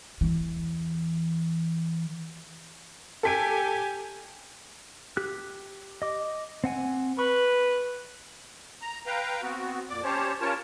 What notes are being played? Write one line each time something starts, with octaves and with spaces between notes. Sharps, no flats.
E2 E3
G4 A4 G#5 B6 D7
G4 F#6
D#5 D6
C4 F#5 G#5
B4 C#6
A#5
B4 F5 G5 A#5
B3 C4 F#4
F2 A#2 D5 D6
C#4 G4 C5 C#5 A5
C#4 F4 A#4 C#5 A5